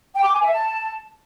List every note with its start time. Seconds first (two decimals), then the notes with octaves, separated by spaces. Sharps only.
0.14 G5
0.24 D6
0.33 G#5
0.43 E5
0.52 A5